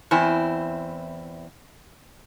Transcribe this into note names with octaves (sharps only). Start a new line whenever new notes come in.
E2 C4 E4 G#5